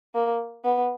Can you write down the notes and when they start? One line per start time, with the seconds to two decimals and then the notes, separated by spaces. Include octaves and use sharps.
0.15 A#3
0.65 B3